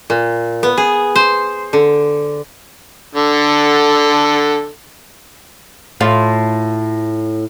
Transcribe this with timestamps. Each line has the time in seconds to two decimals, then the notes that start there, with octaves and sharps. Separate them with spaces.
0.10 A#2
0.63 B3
0.78 G#4
1.16 C5
1.73 D3
3.15 D3 A4
6.01 A2 F4